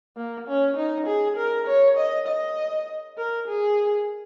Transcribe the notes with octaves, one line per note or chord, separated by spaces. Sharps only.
A#3
C#4
D#4
G#4
A#4
C#5
D#5
D#5
A#4
G#4